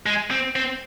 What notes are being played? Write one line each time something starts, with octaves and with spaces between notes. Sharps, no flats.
G#3
C4
C4